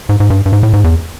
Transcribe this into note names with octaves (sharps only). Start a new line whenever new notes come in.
G#2
G#2
G2
G2
G#2
A2
G#2
E2